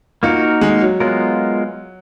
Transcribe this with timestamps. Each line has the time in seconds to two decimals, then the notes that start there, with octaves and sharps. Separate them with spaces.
0.23 A#3 D#4 F4 F#4 A#4
0.61 G#3
0.81 F#3
1.00 F#3 G#3 B3 F4 A#4